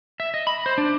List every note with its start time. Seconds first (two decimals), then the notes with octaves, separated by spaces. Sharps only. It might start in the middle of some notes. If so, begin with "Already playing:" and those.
0.20 E5
0.34 D#5
0.47 B5
0.66 C5
0.78 D4